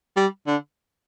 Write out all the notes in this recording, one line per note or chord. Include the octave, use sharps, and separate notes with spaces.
G3
D3